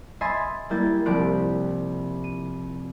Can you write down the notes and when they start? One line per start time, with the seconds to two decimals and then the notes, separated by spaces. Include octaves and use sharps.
0.21 D#5 E5 G#5 B5 C6 A6
0.70 G3 A#3 E4 G6 A6
1.06 C2 F3 G4 F#6 D7
2.24 D#7